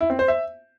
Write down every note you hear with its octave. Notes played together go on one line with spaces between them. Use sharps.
E4
C4
C5
E5